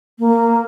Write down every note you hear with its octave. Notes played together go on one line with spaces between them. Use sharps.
A#3